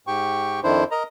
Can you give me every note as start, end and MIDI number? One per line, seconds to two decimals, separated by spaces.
0.07 0.60 44
0.07 0.60 67
0.07 0.60 79
0.07 0.60 85
0.63 0.84 41
0.63 0.84 51
0.63 0.84 62
0.63 0.84 64
0.63 0.84 72
0.91 1.03 70
0.91 1.03 75
0.91 1.03 82